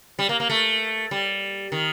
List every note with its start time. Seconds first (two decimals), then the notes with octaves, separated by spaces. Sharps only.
0.19 G3
0.29 A#3
0.40 A#3
0.50 A3
1.11 G3
1.72 D#3